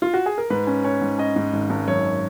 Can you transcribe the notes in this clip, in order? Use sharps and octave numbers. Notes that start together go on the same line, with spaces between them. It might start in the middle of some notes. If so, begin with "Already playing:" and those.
F4
F#4
G#4
A#4
G#2 B4
C#4
C#4 C#5
G#2
C#4 D#5
G#2
G#1
G#1
F#2 C#5